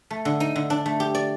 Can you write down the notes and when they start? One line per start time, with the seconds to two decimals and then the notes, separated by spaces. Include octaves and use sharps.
0.11 A3
0.25 D3
0.40 D#4
0.56 D3
0.70 D4
0.86 A3
1.00 G4
1.15 D5